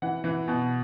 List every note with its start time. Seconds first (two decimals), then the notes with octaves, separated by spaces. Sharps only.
0.02 E3 F#5
0.24 E3
0.48 B2